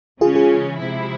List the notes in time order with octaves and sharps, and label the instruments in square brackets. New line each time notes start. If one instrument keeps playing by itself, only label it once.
[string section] C#3 E3 G#3 C#4 [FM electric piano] F4 G#4
[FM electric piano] F4 G#4
[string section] C3 F3 G#3 E4